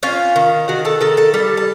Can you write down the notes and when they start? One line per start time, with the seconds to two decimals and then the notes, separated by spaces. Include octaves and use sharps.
0.03 C#4 F4 F5
0.36 D#3
0.68 D#3 F#4 F#5
0.85 A4 A5
1.01 D#3 A4 A5
1.17 A4 A5
1.34 G3 A4 A5
1.57 A5